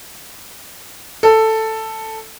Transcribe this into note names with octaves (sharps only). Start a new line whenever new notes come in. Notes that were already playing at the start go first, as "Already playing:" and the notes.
A4